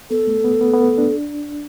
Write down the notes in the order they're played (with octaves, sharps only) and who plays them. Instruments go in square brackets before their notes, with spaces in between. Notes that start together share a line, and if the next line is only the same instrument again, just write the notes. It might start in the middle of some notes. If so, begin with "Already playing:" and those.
[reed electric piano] B3 [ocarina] A4
[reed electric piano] A3
B3
B3
B3
B3
D4